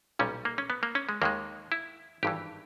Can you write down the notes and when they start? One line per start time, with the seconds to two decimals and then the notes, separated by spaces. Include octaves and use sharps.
0.19 B1 A#2 G3 C#4
0.45 A#3
0.58 C#4
0.70 B3
0.83 A#3
0.95 C#4
1.09 G#3
1.22 D#2 D#3 G#3 A#3
1.72 E4
2.23 G#1 G2 E3 G4